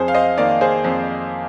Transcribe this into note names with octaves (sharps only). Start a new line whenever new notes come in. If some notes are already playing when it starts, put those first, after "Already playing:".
Already playing: F2 G#4 C5
F5
C5 D#5
D#3 A#3 D5 F5
G#4 C5
F2